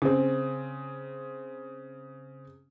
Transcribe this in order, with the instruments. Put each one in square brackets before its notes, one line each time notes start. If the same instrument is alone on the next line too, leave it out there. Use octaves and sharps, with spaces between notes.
[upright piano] C#3 C4